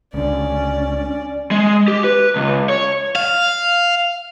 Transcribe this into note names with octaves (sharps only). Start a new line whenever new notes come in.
C#2 D3 C#4 D5
G#3
G4
B4
C#2
C#5
F5